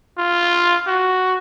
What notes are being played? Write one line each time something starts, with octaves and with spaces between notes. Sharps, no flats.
F4
F#4